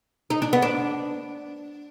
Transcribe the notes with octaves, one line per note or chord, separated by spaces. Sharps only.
D#4
D4
B3
D4